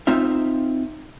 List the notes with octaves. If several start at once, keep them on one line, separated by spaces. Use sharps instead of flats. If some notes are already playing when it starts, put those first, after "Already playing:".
C4 D#4 F4 E5